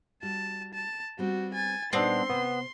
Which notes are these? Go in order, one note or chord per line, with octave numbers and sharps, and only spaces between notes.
G3 F#4 A5
A5
G3 B3 C4 F#4
G#5 A6
A#2 G3 B3 C4 D4 D#4 C6
C3 B3 C5